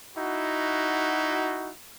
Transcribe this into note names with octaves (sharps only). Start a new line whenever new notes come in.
D#4 E4 F#4